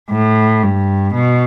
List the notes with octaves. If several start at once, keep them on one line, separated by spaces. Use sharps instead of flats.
A2
G2
B2